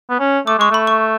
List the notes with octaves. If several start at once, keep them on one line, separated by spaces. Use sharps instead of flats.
B3
C#4
A3 D6
G#3 C#6
A3 B5
C#6